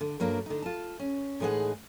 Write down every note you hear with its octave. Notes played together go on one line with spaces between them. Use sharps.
D3
G2 F#3 A#3 D4
D3 D#4
F4 A5
C#4
A2 E3 G#3 D#4 G#4 F#5